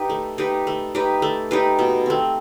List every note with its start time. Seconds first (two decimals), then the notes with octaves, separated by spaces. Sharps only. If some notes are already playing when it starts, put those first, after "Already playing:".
Already playing: D#4 G4 B4
0.10 A3
0.38 D#4 G4 B4
0.67 A3
0.95 D#4 G4 B4
1.22 A3
1.51 D#4 G4 B4
1.79 B2
2.06 A3 C4